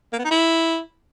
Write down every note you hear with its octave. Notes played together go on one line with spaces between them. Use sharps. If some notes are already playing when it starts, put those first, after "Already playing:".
A#3
B3
D#4
E4